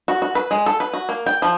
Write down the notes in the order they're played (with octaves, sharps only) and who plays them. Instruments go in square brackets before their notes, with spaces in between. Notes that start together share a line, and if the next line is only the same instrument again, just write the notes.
[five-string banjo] F#4
F#4
B4
G#3
A4
B4
F#4
A#3
G5
F3